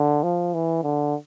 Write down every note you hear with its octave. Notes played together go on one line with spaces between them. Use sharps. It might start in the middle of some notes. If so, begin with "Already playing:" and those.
Already playing: D3
F3
E3
D3